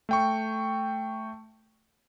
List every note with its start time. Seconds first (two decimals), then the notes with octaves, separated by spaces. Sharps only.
0.09 A3 G5 C#6